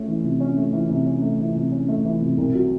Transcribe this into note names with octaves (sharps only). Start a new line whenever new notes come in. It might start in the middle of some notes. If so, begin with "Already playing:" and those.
Already playing: A3 C#4
E3
C3
C#4
A3
E3
C3
C#4
A3
E3
C3
C#4
A3
E3
C3
C2
F#3